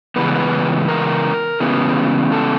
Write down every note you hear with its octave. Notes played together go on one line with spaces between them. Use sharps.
C#3 E3 G#3 B3 B4
A#4
C#3 E3 G#3 B3
A4